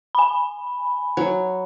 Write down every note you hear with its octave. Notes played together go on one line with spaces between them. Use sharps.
G#5 B5
F#3